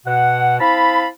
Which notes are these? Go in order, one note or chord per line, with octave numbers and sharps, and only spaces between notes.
B2 F#5
C4 E4 F5 A5 B5